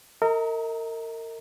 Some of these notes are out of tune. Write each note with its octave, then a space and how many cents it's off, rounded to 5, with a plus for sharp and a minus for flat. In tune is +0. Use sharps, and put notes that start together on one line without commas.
A#4 -35 D#5 +35 A#5 +0